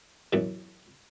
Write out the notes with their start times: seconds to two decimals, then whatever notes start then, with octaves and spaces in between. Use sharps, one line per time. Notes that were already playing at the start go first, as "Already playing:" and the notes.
0.33 F#2 B2 E3